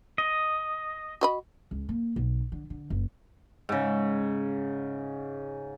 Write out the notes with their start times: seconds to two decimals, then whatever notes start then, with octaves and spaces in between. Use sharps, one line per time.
0.18 D#5
1.21 F#4 D#5 B5
1.71 C#2
1.89 A#3
2.16 B1
2.52 D3
2.70 D3
2.90 F#1
3.69 G#2 C#3